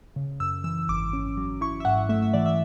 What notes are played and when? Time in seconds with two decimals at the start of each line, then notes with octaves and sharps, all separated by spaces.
0.16 C#3
0.40 F#2 E6
0.64 E3 E6
0.88 G#1 D6
1.13 C#4
1.37 F#3
1.61 E4 C#6
1.80 E5
1.85 G#2 F#5
2.09 A3 E5
2.22 E5
2.34 E3 D5
2.46 E5